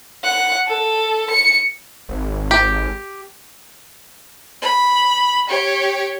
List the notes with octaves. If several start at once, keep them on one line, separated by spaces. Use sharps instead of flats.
F#5
A4
C#7
G#1
G4
B5
G4 C#5